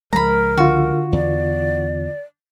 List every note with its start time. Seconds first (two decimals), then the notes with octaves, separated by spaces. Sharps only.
0.13 C#2 F3 G#3 A#4 A#5 B5
0.57 D3 F4 F#4
1.13 E2 D5